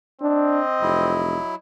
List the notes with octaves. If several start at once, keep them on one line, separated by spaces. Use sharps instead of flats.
C4 D4 D#5
F1 F#3 E4